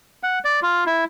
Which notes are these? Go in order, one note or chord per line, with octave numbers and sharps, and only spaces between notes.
F#5
D5
F4
E4